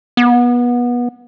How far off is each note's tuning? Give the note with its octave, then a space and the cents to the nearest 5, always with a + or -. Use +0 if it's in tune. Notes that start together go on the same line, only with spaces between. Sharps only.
B3 -25